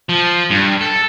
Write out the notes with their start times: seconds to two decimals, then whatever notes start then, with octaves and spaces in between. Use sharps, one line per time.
0.09 F3
0.50 G2
0.81 A4